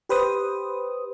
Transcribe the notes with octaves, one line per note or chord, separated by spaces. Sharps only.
G4 B4 C5 D#6